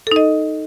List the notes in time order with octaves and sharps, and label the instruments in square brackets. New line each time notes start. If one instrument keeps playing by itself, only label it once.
[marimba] A4
D#4
D#5